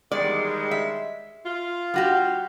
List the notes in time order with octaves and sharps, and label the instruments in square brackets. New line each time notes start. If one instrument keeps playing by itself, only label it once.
[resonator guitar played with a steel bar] E2 D5 [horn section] D#3 G3 G#3
[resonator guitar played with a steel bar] E5
[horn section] F4
[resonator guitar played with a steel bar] G3 F#4 G4